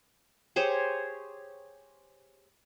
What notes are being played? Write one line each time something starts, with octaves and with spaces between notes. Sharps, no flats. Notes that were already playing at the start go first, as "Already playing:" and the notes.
G4 G#4 C5 C#5